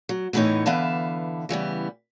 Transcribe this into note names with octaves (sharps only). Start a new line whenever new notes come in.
F#3
E2 A2 E3 B3 D#4 C#5
D3 E3 B3 E5 F5 A5
C#3 E3 G3 B3